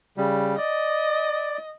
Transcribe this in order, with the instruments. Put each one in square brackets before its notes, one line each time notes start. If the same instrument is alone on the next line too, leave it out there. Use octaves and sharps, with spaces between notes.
[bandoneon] C#3 G3
[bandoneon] D5 [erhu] D#5